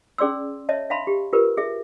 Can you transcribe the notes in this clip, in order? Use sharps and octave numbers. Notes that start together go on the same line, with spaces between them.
C#4 G#4 D5 C6 E6
C#5 D#5 E5 A5
E5 F5 A5 B5 C6
G4
F4 G4 A#4 B4
G#4 E5